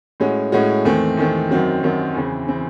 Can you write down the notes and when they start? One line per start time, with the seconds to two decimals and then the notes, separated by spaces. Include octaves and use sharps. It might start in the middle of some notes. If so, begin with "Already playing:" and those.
0.20 A2 G#3 C#4 F#4
0.52 A2 G#3 C#4 F#4
0.85 E2 D#3 A3 C4
1.17 E2 D#3 A3 C4
1.51 F#2 D#3 F#3 C4 F#4
1.83 F#2 D#3 F#3 C4 F#4
2.15 E2 C#3 E3 C4
2.48 C#3 E3 C4